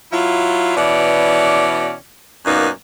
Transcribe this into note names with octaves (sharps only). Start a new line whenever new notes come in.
F#3 E4 F4
B2 E3 C#4 D5
F#2 A#2 A#3 B3 D#4